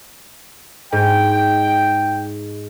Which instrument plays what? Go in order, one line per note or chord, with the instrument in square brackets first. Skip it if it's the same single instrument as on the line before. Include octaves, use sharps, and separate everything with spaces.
[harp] G#2 [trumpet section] G5